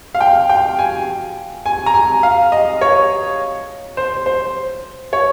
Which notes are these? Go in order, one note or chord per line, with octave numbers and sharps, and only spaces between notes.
F5
G5
G5
G#5
G#5
A#5
G#5
F5
D#5
C#5
C5
C5
C#5